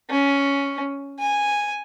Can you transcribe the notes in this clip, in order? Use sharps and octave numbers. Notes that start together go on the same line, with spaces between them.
C#4
G#5